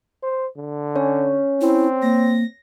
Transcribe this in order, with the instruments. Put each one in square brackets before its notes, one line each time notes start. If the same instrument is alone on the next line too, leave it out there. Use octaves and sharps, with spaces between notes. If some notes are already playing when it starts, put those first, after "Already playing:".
[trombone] C5
D3
[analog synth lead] C#4 [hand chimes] C#5
[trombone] C4 [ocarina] E4
[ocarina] A#3 [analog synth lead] A#6